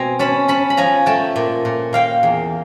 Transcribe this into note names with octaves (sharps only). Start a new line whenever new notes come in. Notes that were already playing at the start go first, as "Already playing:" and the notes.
Already playing: B2 C4 G#5 A#5
C#4 A5 B5
C#4 A5 B5
B5
F3 G#5 A#5
A3 G5 A5
A#2
A#2
A#3 F5 G5
E2